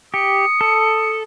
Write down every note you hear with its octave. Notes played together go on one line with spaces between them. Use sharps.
G4 D#6 C#7
A4